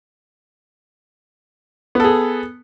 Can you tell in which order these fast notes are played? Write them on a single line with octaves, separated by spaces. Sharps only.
B3 A4 G#4